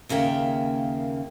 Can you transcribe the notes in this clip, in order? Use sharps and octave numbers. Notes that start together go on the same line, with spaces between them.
D#2 C#3 A#3 E5 G5